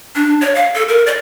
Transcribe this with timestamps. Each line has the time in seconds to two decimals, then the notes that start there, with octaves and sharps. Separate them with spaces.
0.16 D4
0.41 C#5
0.55 F5
0.74 A4
0.88 A#4
1.06 D5